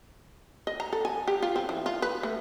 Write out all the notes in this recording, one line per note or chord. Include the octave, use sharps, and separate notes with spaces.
D#5
A#5
A4
G#5
G4
F4
C4
E3
F4
B4
A3